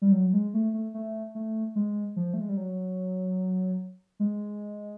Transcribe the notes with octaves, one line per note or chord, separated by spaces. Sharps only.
G3
F#3
G#3
A3
A3
A3
A3
G#3
F3
A3
G#3
G3
F#3
G#3